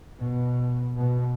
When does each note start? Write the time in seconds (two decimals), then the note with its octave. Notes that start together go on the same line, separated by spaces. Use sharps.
0.20 B2
0.95 B2